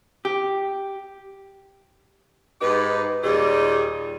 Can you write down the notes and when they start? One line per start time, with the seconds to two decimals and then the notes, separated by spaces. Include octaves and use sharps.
0.25 G4
2.62 G#2 D#4 G4 B4
3.23 D#2 A#2 G3 D#4 G#4